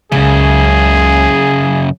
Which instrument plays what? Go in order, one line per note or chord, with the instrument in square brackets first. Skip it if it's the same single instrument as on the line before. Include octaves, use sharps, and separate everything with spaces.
[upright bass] C#2 [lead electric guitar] F#2 C#3 [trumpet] G#4